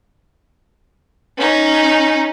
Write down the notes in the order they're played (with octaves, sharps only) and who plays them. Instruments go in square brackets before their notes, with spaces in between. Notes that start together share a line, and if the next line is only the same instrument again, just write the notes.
[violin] C#4 D#4